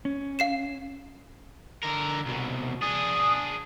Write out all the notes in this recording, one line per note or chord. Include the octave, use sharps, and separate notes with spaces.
C#4
F5 C7 E7
D3 A#4
C2 B2
D4 G#4 D#6